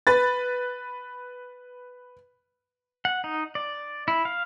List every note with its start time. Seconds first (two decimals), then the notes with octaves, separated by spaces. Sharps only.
0.07 B4 A6
3.05 F#5
3.24 D#4
3.55 D5
4.08 E4
4.25 F5